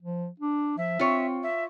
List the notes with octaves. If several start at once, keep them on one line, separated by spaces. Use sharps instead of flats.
F3
D4
F3 E5
C4 F4 C#5
E5